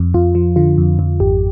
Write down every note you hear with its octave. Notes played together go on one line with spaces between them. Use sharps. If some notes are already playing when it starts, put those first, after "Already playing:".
Already playing: F2
F2 F4
F3
D3 F4
F2
F2
G#1 G4